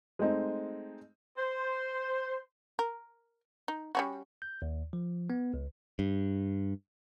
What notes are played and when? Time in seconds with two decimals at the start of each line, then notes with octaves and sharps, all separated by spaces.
0.19 G#3 A3 C4 D#4
1.38 C5
2.79 A#4
3.68 D#4
3.95 G3 C#4 F#4
4.42 G6
4.62 D#2
4.93 F3
5.30 B3
5.54 C#2
5.99 G2